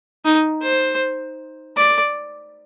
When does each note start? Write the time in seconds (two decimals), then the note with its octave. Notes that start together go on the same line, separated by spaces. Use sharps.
0.25 D#4
0.62 C5
1.77 D5